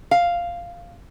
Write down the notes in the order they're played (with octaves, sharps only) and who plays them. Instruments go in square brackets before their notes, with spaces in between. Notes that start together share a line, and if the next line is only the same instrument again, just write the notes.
[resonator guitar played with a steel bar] F5